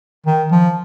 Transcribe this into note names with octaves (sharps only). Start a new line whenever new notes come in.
D#3
F3